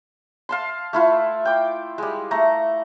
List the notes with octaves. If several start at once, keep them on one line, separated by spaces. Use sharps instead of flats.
F5 A5 C6
A3 E4 F4
G5 D6
G3 G#3
A3 A#5